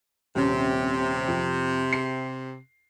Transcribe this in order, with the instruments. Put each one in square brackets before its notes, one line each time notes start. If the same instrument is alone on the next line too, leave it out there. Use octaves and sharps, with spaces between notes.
[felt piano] D#1 C#4 [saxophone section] C3
[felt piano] F2
C7